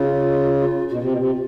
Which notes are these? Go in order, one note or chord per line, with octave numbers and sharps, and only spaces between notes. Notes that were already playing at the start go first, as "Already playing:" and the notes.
Already playing: C#3 F4
B2 F#4
C3 F4
B2
C3